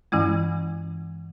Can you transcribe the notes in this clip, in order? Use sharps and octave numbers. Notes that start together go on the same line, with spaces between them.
G2 E3 G#3 C#4 E4